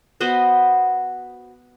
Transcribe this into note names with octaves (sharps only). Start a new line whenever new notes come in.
B3 F#4 C5 D#5